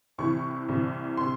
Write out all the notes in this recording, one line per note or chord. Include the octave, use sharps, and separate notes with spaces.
C2 C3 E3 C#6
C2 C3 E3
C3 C6